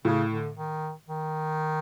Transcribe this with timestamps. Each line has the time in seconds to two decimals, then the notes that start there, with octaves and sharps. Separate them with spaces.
0.05 A2 C#3
0.31 D3
0.56 D#3
1.08 D#3